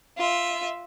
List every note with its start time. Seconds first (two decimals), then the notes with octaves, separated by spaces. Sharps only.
0.18 F4 E5